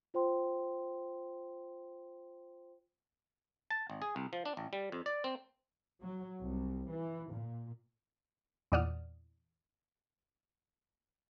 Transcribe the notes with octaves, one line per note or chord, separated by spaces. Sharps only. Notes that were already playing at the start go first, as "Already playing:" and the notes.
F4 C5 G5 C6
A5
G#1
G#4
C2
F3
D4
A1
G3
F2
D5
C4
F#3
C2
E3
A#2
E2 A#2 D5 F#5 D#6 F6